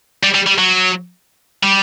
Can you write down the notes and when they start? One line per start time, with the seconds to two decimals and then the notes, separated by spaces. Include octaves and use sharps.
0.23 G3
0.35 G3
0.47 G3
0.58 F#3
1.63 G3